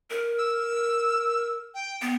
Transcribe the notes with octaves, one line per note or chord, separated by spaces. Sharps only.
A#4
E6
G5
B3